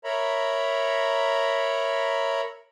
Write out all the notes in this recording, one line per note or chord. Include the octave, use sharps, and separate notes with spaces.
A#4 C#5 E5 A#5 B5